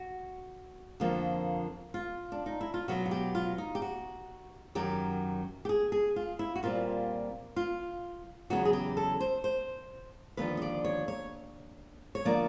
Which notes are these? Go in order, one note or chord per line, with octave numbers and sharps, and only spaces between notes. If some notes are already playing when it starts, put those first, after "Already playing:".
Already playing: F#4
F2 D3 F3 A#3
F4
D4
D#4
E4
F4
B2 F#3 B3 F#4
F#4
G4
F4
D#4
G4
F#4
F#2 D#3 F#3 G4
G4
G#4
G#4
F4
E4
F#4
A#2 G3 C4 F4
F4
E2 C#3 F#3 B3 F#4
G#4
G4
A4
C5
C5
D#2 D3 F3 B4
D#5
D5
C#5
C#5
C#5
D3 F3 A#3 D5